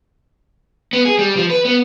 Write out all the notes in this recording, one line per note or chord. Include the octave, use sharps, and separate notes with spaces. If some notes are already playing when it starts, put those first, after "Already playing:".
B3
G#4
G3
F3
B4
B3